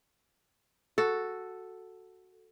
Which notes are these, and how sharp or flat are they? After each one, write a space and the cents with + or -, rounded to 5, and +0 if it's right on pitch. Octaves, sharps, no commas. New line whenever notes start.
F#4 +0 A4 +0